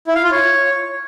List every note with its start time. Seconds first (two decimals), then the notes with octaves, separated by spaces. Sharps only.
0.07 E4
0.15 F5
0.23 F4
0.31 C#5